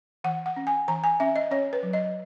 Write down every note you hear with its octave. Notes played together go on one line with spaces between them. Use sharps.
E3 F#5
F#5
C#4
G#5
E3 A#5
G#5
C#4 E5
D#5
C#4 C#5
B4
F#3
D#5